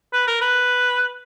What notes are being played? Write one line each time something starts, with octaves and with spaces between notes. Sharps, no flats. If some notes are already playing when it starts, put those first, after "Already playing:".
B4
A#4
B4